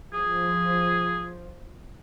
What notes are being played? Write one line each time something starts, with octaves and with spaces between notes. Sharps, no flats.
F3 G#4